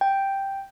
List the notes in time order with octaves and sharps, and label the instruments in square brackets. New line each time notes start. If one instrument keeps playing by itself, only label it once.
[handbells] G5